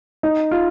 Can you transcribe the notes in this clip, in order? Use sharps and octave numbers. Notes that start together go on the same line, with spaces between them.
D#4
F4